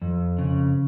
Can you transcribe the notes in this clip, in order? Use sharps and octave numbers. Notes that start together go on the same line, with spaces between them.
F2
C#3